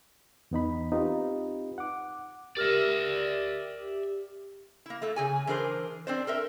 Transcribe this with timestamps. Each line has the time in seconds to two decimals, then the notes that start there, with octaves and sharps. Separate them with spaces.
0.51 E2 B3 D#4 B5
0.92 C4 D#4 F4 G4 B4
1.78 F#5 D6
2.57 G4 A#4 D5 E5 F6 A#6
4.86 A#3 E4
5.02 A3 A#3 A4
5.16 C#3 G#4 G#5
5.47 E3 D4 G#4 A#4 C5
6.07 C4 D4 C5
6.27 A4 A#4 E5